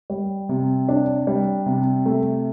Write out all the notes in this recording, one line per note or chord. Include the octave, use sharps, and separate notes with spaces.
G3
C3
D4
G3
C3
A3